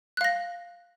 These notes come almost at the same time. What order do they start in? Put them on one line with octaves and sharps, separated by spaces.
F#6 F5 A#6